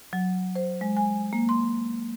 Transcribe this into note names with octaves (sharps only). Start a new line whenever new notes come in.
F#3
C5
G#3
G#5
A#3
C6